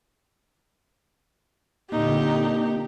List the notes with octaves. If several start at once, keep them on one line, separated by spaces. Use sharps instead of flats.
A#2 D3 A#3 C4 D#4 G4